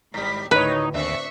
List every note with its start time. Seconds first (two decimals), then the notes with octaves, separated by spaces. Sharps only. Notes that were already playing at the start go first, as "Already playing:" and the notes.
0.14 G#1 G#2 G3 B6
0.51 D2 A2 D#3 D#4 B4 C#5
0.94 D#2 C4 D4 E5 C#6